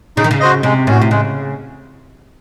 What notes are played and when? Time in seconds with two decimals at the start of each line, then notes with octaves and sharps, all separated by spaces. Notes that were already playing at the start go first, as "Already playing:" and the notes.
0.17 C#3 D#4
0.24 D#3
0.31 C#3
0.40 F#4 C5 D#5
0.63 C3 G#3
0.87 A2 C#4 F#4
1.02 C3
1.11 C#3 G#3